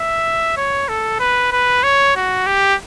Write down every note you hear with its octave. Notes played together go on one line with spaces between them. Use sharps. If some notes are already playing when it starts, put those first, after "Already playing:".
Already playing: E5
C#5
A4
B4
B4
C#5
F#4
G4